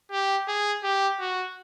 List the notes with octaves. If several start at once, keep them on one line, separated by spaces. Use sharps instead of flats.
G4
G#4
G4
F#4